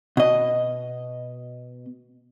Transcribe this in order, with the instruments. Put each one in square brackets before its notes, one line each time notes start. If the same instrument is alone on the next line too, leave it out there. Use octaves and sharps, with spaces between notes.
[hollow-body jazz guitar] B2 D#5